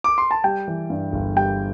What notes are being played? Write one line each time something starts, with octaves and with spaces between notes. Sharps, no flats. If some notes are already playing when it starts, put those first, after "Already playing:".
D6
C6
A5
G3 G5
E3
G2
G1
G3 G5